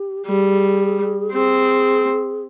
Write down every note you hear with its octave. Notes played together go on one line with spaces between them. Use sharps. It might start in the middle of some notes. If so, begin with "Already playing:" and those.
Already playing: G4
G3 G#4
C4 G#4